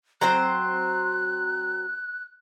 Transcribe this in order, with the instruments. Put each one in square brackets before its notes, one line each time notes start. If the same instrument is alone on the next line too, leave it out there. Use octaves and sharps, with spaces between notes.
[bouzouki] F#3 C4 C5 [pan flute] F#6